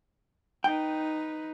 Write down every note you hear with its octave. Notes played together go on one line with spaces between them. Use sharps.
D#4 B4 G5